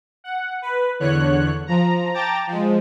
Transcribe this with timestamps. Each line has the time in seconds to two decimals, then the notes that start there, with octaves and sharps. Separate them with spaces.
0.24 F#5
0.62 B4
1.00 E2 D3 C#5 F#6
1.67 F3 A#5
2.14 G5 A5 A#5 D6 A6
2.47 F3 G#3